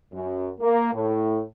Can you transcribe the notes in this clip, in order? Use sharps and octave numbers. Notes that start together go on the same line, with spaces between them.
F#2
A#3
A2